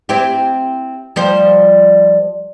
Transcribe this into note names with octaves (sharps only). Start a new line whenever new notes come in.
C4 E4 G4
F3 G3 C5